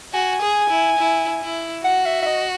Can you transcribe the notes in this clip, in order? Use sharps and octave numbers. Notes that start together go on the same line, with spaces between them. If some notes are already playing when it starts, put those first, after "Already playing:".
F#4 G#5
G#4
E4
E4
E4
F#4 F#5
E5
E5
D#5